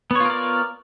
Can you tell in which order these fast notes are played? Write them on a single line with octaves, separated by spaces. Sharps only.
B3 C#5 F4 A#4 D5